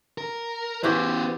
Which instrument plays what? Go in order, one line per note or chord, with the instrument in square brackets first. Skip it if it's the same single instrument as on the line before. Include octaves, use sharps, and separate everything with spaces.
[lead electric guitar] A#4
[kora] E3 F#4 G4 [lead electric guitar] B3 C5